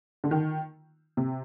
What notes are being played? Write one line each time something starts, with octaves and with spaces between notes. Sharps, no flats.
D3
D#3
C3